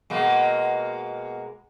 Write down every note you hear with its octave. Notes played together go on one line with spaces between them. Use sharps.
B2 G#3 A#3